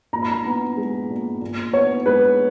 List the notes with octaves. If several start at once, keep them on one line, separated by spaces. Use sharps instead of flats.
A#2 A#5
B5
A#5
B3
G#3
A#2
A#2
B3 C#5
G#3 B4